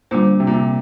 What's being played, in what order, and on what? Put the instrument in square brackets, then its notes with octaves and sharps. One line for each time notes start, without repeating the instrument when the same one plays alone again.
[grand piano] A#2 [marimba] D3 G3 D4 F4 C5
[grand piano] C3
A#2
C3